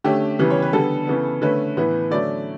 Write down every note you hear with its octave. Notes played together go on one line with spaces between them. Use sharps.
D3 A3 C#4 G4
C#3 E3 G3 B3
C#5
B4
D3 G3 B3 A4
C#3 E3 B3
D3 A3 C#4 B4
A2 E3 B3
D3 F#3 A3 C#4 D5